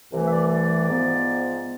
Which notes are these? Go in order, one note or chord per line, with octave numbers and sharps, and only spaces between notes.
C2 C3 E3 A3
E5
D5
D5
G#2 F3 B3